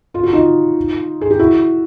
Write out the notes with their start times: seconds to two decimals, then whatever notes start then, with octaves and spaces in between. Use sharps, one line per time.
0.14 F4
0.23 F#4
0.32 D#4 F4
1.21 G#4
1.30 G4
1.39 E4 F#4